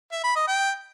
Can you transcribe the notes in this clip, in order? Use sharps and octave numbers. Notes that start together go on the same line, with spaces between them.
E5
B5
D#5
G5